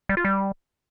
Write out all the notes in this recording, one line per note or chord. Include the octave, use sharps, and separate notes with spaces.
G3
F4
G3